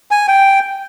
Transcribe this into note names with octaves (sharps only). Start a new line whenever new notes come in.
G#5
G5